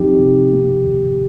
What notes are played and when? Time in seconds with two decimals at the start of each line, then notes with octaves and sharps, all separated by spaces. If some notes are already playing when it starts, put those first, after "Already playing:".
Already playing: F3 C4 D#4 G4
0.19 C3
0.53 A#3
0.84 D#2